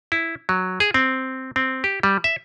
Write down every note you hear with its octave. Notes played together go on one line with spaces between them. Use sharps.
E4
F#3
G#4
C4
C4
G4
G3
E5